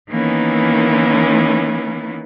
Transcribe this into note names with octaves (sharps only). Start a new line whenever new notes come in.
D#3 E3 A#3 B3 C#4 E4